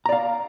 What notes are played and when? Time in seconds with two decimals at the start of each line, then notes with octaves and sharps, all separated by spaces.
0.06 A#5
0.09 D5
0.12 F5